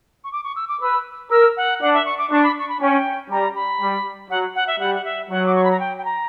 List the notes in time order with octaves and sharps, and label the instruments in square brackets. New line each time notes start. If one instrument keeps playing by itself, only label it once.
[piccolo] C#6
D6
C#6
E6
D6
[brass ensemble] B4 [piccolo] E6
[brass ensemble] A#4 [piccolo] E6
[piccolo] F#5
[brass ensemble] D4 [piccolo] F#5
[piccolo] E5
C#6
D6
[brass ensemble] D4 [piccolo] C#6
[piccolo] B5
C#6
B5
[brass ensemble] C#4 [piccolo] G5
[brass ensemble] G3 [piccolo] A#5
[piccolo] B5
[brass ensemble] G3
[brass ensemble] F#3 [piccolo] F#5
[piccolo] F#5
E5
[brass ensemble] G3 [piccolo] F#5
[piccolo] F#5
E5
[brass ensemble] F#3 [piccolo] F#5
[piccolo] D6
C#6
B5
A#5
G5
G5
A#5